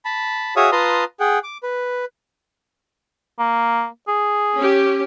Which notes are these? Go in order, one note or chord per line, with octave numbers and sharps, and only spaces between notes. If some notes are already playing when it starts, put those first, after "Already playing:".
A5 B5
F#4 G#4 C#5 E5 F5 D#6
F4 B4 A5 A#5 C6 D#6
G#4 F#5 G5
D6
B4
A#3
G#4
C#4 G4